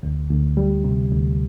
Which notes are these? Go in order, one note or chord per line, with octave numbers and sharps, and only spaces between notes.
D2
D2
G3
C3
D2